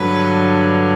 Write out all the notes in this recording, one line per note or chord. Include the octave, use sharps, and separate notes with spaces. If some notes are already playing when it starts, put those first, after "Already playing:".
Already playing: G2 D3 F#3 B4